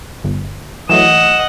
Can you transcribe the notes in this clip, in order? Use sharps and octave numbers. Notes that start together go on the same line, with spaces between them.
G1
E3 F#3 A3 D#5 F#5 E7